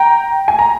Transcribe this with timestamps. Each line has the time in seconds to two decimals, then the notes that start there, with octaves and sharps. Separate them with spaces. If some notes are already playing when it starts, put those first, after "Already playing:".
Already playing: G5 A#5
0.48 G#5
0.59 A#5